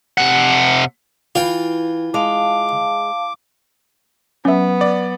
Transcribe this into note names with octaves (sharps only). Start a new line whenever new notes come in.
C3 F#5
E3 F4 G5
G#3 F5 A5 D6
F#3 B3 C#4 E5
D5